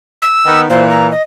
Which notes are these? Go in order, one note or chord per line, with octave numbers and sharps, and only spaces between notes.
E6
D#3 B3
A#2 E3 C5
A#5
D#5